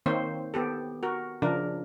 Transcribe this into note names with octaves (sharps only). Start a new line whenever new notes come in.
D#3 A#3 C4 C5 C#5
B3 G4 A4
F#4 A#4
C#3 F3 D4 A#4